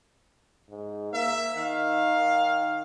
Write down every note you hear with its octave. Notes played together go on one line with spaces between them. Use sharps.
G#2
A#3 E5
D#3 F5